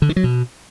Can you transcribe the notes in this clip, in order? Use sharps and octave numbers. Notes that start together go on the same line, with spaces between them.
D3
D#3
F#3
B2